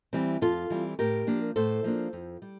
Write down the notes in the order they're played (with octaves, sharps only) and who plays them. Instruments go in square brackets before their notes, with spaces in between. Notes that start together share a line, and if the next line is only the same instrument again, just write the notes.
[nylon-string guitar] E3 G3 C4
F2 F4 A4
E3 G3 C4
A2 G4 A#4
F3 A#3 D4
A2 A4 C5
F3 A#3 D4
F2
G3